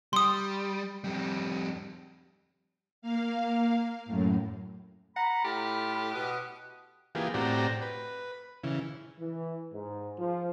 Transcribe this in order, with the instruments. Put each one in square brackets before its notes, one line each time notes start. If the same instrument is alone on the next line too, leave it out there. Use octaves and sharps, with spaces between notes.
[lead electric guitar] G3 [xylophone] C6 D#6
[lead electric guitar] F2 G3
[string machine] A#3 F5
F#2 A2
[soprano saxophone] F#5 [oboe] A#5 [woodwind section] B5
[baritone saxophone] A2 [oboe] F4 [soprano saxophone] G4
[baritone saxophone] B2 [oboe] F#5 [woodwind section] D#6
[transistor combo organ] E3 A#3 B3 F4 G4 G#4
A2 C4 F#4 G4 D5 A#5
B4
C#3 E3
[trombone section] E3
G#2
F3